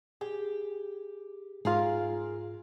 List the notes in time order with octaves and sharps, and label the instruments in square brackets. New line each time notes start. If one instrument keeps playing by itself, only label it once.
[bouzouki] G4 [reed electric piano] G#4
[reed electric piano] G#2 F4 [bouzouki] G#4 A#4 F5